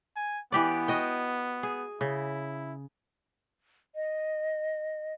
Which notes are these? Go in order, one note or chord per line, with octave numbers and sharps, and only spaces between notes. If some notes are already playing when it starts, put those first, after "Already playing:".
G#5
E3 B3 G4 D5
F#4 D#5 G5
G#4
C#3 E4
D#5